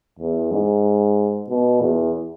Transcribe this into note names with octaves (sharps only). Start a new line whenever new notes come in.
E2
G#2
B2
E2